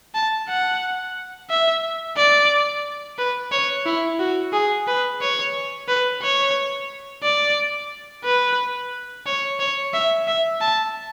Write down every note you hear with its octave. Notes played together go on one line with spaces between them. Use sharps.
A5
F#5
E5
D5
B4
C#5
E4
F#4
G#4
B4
C#5
B4
C#5
D5
B4
C#5
C#5
E5
E5
A5